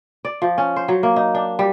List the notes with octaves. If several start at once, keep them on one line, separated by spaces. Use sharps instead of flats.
D5
F3
C#4
C5
F#3
A#3
D#4
D4
G3